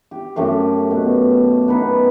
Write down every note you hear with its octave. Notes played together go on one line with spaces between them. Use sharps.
G4
F#2 A3 G4 C5
B2
A5
B3 D#4 B4